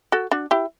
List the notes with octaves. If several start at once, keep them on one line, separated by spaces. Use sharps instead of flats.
F#4 A4
D4 F#4
E4 G4